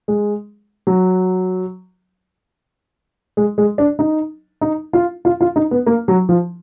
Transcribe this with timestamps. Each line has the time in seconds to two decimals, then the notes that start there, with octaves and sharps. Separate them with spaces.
0.08 G#3
0.87 F#3
3.37 G#3
3.58 G#3
3.78 D4
3.99 D#4
4.61 D#4
4.93 F4
5.25 F4
5.41 F4
5.56 D#4
5.71 B3
5.86 A#3
6.08 F#3
6.29 F3